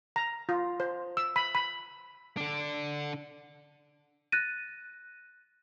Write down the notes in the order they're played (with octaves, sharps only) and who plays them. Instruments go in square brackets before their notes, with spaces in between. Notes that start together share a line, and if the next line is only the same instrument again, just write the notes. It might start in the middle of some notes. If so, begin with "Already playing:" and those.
[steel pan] A#5
F4
C5
E6
B5
B5
[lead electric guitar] D3 D4
[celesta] F#6 A6 A#6 D#7